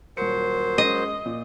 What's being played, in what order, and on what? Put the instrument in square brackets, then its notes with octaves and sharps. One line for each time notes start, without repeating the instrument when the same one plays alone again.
[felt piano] D#1 C#7 [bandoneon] F#3 C5 [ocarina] A#4
[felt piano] G#3 C#4 [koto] D#5
[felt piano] A#2